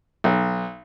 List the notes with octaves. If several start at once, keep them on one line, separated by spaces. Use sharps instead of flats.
B1